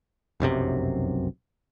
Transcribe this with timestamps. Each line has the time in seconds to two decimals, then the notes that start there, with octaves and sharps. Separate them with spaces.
0.40 F1 B1 F#2 C3